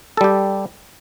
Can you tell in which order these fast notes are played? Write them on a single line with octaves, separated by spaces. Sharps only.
A4 G3 G4